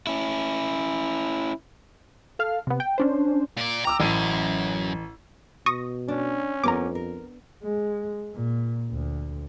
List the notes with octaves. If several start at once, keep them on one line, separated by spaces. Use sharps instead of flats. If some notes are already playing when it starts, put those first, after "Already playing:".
C#4 E4
A4 F5 F6
C3 B3
G5
C#4 D4 C5
A#2 D5
G5 A#5 D6 E6
A1 F#2 D#7
B2 C#6 D#6 A#6
C#4 D4
F2 B3 A#4 A#5 D6
A#4
G#3
A#2
D2